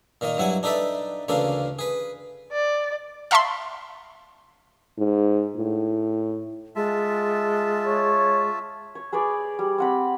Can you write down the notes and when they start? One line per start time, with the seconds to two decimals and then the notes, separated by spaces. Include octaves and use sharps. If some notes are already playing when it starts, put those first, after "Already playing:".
0.21 A#2 D#3 A#3 D#5
0.37 G2 F#3 E4 F#5 G#5
0.63 D4 D#4 A4 B4 D5 E5
1.28 D2 C#3 E3 A#3 D4 A4
1.79 G#4 B4
2.52 D5
3.31 E5 F5 A5 B5 C6
4.98 G#2
5.57 A2
6.76 G#3 F4 E5 A5
7.86 C#5
8.95 C#5
9.12 G#4 B4 C#5 D5
9.59 G3
9.78 C4 F#5 B5